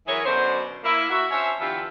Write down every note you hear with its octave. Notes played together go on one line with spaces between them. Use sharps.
E3 F#3 E4 G#4 A#4 C#5
F#2 B2 D3 D4 C5
A#3 E4
F#4 E5
C#4 D4 C5 C#5 E5
D3 E3 B3 F4 G4 E5